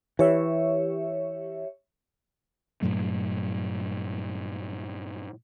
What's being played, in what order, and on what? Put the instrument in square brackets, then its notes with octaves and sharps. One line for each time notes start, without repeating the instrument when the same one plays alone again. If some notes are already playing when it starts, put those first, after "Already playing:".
[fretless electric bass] E3 [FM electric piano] G4 C#5 E5
[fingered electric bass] G2 A#2 F#3 A3